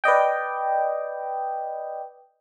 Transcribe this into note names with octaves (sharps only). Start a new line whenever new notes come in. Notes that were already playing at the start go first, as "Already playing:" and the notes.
B4 D5 D#5 G5